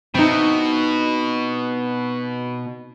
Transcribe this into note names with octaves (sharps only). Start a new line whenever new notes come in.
B2 C4 D#4